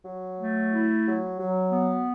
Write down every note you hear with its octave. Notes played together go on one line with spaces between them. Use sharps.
F#3
A3
E4
F#3
F#3
B3